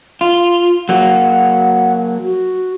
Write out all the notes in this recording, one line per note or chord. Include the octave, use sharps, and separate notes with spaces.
F4
F#3 A#3 F#5
F#4